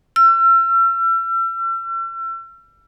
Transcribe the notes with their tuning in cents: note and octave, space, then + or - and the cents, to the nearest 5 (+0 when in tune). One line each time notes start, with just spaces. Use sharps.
E6 +40